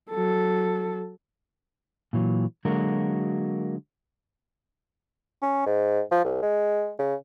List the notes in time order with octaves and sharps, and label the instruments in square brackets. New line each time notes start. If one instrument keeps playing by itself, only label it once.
[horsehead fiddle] F#3 A4
[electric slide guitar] A#2 E3 F#3
D3 F#3 G#3 A#3 F#4 A#4
[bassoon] C#4
G#2
F3
C2
G#3
C#3